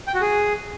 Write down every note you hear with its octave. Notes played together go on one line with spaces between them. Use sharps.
G5
F#4
G#4